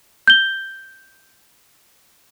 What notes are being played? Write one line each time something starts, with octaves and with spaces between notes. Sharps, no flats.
G6 G7